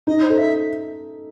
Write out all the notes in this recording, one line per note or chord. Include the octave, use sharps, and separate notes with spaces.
D#4 D#5
C5
A4
E5